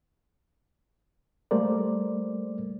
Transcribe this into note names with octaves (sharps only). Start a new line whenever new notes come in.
G3 A3 A#3 A#4 C5 D5